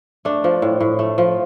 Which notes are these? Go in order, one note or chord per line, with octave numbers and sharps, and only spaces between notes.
A3 D4
F3
A2
A2
A3
F3